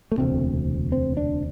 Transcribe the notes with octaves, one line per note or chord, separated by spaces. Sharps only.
A3
E1 D2 C3 C4
C4
D4